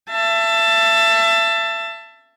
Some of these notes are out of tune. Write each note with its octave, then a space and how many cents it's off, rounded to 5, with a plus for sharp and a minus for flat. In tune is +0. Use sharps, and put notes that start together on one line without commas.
E5 +25 A5 +10